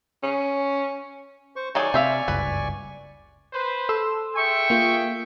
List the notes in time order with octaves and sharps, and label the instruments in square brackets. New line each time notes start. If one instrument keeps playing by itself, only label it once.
[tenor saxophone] C#4
[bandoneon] C5 C#6
[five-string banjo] D#3 F#3 G#4 [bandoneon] D5 G#5 C#6
[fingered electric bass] C3 [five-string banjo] C5 E5 F5
[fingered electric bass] F#1 C#2 G2 [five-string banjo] B4
[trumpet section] B4 C5
[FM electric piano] A4 C6 E6
[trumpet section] G#4 E5 G5 [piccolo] C#6
[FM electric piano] A#3 F4